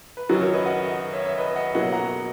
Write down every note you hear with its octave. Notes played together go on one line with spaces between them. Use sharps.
B4
F#2 D#3 F#3 F#4 A#4
A#4 C#5
B4 D#5
D#5 F#5
D#5 F#5
C#5 E5
C#5 E5
B4 D#5
D#5 F#5
B2 F#3 A#3 D#5 F#5
F#5 A#5